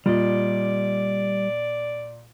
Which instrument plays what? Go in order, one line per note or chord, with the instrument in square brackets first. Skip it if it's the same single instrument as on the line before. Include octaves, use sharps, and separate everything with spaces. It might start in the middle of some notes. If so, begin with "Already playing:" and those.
[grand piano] A#2 [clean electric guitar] G3 D#5 [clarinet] D5